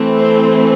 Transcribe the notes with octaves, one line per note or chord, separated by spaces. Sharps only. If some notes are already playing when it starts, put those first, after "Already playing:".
Already playing: E3 A3 C4
C5